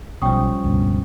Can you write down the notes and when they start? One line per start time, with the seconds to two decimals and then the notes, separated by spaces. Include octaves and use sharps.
0.22 B1 F3 G3 C#4 G5 C#6 D#6
0.64 C#2 G2 B2